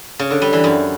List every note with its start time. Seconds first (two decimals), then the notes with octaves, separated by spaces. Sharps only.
0.19 C#3
0.31 D3
0.42 G3
0.53 E3
0.64 F#2